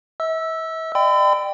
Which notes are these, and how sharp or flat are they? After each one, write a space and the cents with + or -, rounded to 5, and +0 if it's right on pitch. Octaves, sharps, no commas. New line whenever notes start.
E5 -40 E6 +0
D5 +35 G5 +0 B5 +45